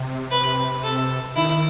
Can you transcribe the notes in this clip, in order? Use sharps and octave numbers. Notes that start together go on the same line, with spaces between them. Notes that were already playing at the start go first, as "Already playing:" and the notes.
Already playing: C3
B4
A4
D#3 E4